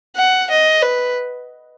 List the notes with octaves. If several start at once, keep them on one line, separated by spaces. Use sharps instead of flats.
F#5
D#5
B4